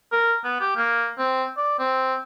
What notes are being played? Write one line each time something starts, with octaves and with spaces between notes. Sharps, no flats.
A#4
B3
G4
A#3
C4
D5
C4